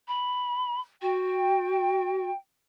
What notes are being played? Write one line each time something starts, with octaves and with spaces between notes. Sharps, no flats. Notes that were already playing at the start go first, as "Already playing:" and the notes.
B5
F#4 G5